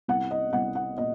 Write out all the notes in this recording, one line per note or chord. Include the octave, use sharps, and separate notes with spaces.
C2 F#5
D#5
C2 F#5
F#5
A#2 D#5